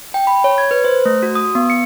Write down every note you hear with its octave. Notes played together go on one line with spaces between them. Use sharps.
G5
B5
C#5
G#6
B4
C5
A3
F#4
D#6
B3
C#7